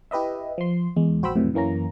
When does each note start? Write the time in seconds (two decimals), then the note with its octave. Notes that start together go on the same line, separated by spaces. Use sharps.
0.11 E4 G4 B4 D#5 E5
0.58 F3 C6
0.96 E2 G#3
1.22 A#1 F#4 C5 G5 B5 E6
1.35 F2 A2 C3 E3 F#3
1.54 F#2 E3 A#3 C#4 A#5